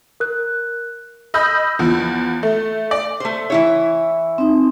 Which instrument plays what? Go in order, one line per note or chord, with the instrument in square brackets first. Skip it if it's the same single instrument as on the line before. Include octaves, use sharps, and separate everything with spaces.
[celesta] A#4 F#6
[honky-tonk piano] D#5 B5 E6 G6
E2 F3
A3
D5
[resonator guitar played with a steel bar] A3 C5
E3 E4 C#5
[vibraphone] C4 D#4